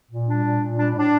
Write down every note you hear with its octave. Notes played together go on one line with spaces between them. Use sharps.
A#2
G3 D4
A#2
A#2
G3 D4
A2 D4